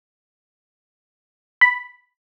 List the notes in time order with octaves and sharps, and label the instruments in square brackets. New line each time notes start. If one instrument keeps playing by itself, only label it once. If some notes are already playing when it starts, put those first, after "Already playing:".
[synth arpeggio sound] B5